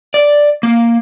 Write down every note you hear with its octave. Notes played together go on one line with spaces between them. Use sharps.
D5
A#3